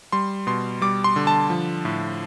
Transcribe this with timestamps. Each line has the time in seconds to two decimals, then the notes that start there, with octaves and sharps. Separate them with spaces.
0.12 G3 C6
0.47 B2 C6
0.81 G3 D6
1.04 C6
1.16 D3
1.27 A5
1.50 F3
1.85 A2